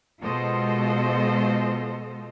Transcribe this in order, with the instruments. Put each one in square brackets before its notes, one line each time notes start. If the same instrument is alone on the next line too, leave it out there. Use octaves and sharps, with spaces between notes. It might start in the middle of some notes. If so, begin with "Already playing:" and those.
[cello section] B2 G#3 F4 A4 C5 D#5